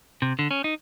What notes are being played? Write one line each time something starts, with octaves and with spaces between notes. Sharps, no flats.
C3
D3
C#4
D#4